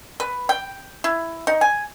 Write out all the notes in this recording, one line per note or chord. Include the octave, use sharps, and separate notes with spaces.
B4
G5
E4
D#4
G#5